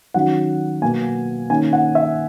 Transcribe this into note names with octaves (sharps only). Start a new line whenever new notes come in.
D#3 F#3 C#4 F#5
B2 F#3 A#3 G#5
D#3 A#3 C#4 G#5
F#5
E5